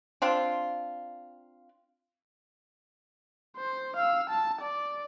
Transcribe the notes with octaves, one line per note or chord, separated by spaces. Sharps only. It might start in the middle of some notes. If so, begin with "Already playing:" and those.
C4 D4 F4
C5
F5 E6
A5
D5